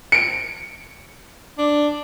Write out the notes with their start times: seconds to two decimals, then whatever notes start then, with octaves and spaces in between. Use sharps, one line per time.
0.12 C#7 D7
1.58 D4